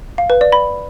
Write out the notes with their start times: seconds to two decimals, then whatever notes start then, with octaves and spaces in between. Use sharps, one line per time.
0.18 F5
0.30 B4
0.41 D5
0.52 B5